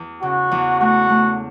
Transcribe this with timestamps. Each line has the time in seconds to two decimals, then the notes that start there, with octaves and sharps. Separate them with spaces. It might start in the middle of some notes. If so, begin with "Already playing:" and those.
Already playing: E2
0.22 C#3 F#4
0.51 E2
0.81 A3 F#4
1.10 A3